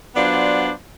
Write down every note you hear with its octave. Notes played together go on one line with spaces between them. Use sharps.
F#3 B3 D4 F4 C5 D5